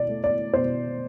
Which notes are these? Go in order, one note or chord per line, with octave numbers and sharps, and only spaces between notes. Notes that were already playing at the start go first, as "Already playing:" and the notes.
Already playing: B2 D5
A3
D5
B2 C5